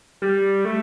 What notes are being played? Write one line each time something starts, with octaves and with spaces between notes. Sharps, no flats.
G3
A3